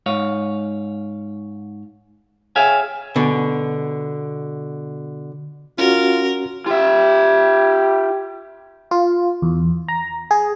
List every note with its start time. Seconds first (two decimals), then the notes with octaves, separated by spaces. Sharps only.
0.06 G#2 C#5 F5
2.56 G#4 C#5 E5 F5 G5 G#5
3.16 B2 D3
5.78 C#4 F4 F#4 A#4
6.66 F4 G4 E5
8.91 F4
9.42 E2
9.88 A#5
10.31 G#4